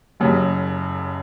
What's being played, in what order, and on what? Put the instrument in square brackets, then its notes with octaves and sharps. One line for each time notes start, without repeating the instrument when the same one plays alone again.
[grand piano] F#1 F#2 C#3